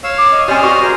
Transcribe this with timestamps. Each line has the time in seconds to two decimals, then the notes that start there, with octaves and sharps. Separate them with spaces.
0.04 C#5 F5 E6
0.18 D6
0.31 D#5
0.48 G3 C#4 C5 D#6 F6
0.63 F#4 G4
0.82 G#4 A#4 C5